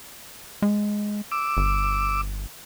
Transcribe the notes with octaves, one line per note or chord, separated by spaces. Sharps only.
G#3
D6 E6
G1